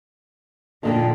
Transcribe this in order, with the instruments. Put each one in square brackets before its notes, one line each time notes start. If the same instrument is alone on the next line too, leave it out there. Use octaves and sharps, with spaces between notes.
[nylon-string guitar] F2 D3 D#3 [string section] A#2